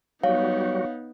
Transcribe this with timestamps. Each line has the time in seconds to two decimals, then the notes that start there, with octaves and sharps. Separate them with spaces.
0.24 F#3 G3 B3 D#4 F#4 C#5 F5